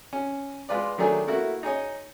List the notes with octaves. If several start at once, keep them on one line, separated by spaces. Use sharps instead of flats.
C#4
G#3 F4 B4 D5
D#3 F#3 A3 D4 G#4
A3 A#3 E4 F#4
D#4 G#4 C#5 D#5